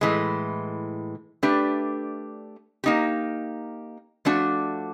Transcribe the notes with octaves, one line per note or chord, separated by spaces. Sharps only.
A2 E3 G#3
A3 D4 G4 B4
A#3 D#4 G4
F3 A3 D4 F#4